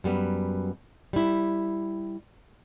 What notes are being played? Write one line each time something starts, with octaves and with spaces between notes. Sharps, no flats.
F#2 G3 B3
G3 E4